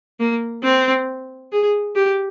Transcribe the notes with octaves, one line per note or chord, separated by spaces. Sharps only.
A#3
C4
G#4
G4